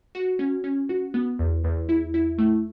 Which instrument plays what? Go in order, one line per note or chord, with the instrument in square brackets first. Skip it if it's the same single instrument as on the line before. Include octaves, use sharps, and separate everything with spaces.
[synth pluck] F#4
C#4
C#4
F#4
B3
E2
E2
E4
E4
A3